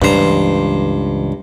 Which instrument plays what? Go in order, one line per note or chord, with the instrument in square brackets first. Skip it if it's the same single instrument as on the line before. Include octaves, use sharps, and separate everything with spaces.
[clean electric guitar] C#2 C5 [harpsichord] G2 A#5 [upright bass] E3